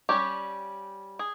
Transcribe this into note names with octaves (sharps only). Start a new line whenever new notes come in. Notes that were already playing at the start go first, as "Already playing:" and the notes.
G3 C#4 G4
G#4